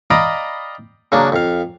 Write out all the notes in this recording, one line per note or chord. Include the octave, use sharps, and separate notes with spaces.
D5 D#5 F5 G5 A#5 B5
C#3 F#3 A#3 D4
F2 F5